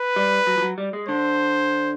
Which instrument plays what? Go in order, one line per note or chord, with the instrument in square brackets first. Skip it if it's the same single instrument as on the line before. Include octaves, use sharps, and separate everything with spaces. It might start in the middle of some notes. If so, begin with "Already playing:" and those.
Already playing: [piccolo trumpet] B4
[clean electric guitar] G3
F#3
F3
F#3
G3
G#3
[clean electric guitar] D3 [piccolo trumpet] C5